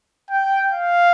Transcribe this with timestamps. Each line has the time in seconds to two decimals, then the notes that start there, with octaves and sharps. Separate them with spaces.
0.31 G5
0.72 F5